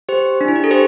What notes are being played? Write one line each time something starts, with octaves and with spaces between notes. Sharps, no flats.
G4 C5
D4
E4
G4
A4
G4 C5